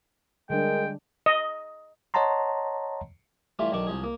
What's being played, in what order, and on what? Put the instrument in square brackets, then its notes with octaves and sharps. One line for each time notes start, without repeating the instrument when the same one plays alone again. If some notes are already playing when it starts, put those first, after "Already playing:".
[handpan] D3 G3 D4 [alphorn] G#3 [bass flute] A#4 [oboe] G5
[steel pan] D#5
[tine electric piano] C#5 D#5 F#5 A5 A#5 C6
[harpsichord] E3 G3 A3 F4
B1 D#3 D4 C#6 D6
C2 F3 G#4
A#3